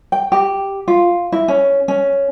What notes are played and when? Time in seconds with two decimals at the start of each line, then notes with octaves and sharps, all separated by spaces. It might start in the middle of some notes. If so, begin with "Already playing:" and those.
0.12 G5
0.32 G4
0.88 F4
1.32 E4
1.48 C#4
1.88 C#4